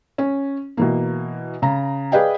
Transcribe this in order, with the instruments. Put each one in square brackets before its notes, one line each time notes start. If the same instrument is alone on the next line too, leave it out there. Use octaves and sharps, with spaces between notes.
[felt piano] C#4
B2 E3 A#3
C#3 A#5
G#4 B4 D5 D#5 F5 G5